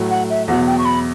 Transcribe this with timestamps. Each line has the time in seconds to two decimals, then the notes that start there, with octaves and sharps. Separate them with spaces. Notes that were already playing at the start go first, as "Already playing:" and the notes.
Already playing: A2 F#3 A3
0.10 F#5
0.29 E5
0.48 E2 B2 F#3 F#5
0.67 G5
0.78 C#6
0.85 B5